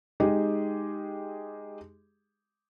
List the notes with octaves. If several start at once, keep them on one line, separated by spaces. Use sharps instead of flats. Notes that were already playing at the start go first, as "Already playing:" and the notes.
G#3 D#4 G4 G#4